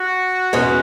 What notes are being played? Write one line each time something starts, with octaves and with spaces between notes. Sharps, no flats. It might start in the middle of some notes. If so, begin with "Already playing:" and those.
Already playing: F#4
E2 B2 G#3 C#4